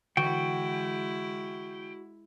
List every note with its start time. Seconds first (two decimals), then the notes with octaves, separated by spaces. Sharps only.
0.17 D3 E3 G#3 E4 F#4 G5